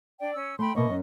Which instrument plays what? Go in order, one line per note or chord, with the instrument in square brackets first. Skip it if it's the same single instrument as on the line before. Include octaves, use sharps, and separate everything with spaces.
[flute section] D4 D5 G5
C#4 E6
[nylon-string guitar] A3 [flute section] G5 B5 C6
[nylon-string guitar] B2 A#3 E5 [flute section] D#5 C#6
[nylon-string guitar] F#2